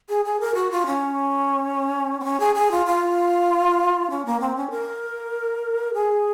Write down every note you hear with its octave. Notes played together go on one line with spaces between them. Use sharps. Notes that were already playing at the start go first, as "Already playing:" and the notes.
G#4
G#4
A#4
F#4
F4
C#4
C4
C#4
G#4
G#4
F4
F4
C#4
A#3
C4
C#4
A#4
G#4